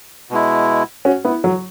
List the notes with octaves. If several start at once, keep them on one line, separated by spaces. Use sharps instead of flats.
B2 G#3 E4
C#4 F#4
B3 E4
F#3